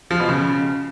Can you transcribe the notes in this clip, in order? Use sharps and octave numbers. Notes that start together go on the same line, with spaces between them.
F3
B2
C#3